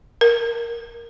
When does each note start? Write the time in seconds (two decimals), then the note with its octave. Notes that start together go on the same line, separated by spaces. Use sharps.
0.21 A#4